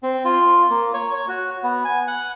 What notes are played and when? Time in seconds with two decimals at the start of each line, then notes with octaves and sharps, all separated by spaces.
0.03 C4
0.25 F4
0.70 A#3
0.94 C#5
1.13 C#5
1.28 F#4
1.63 B3
1.85 G#5
2.07 F#5